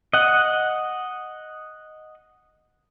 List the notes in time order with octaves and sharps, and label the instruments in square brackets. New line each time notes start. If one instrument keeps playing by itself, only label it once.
[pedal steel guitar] D#5 F#5